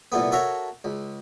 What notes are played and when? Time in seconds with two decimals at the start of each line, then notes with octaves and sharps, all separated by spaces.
0.12 C2 A#2 A3 B3
0.32 F#4 A4 A#4 C#5 E5
0.84 C#2